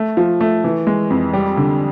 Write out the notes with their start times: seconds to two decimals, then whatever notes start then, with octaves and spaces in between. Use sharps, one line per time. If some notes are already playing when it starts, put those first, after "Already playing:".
Already playing: A3
0.17 F3
0.41 A3
0.64 E3
0.87 G#3
1.10 F2
1.33 G3
1.57 D3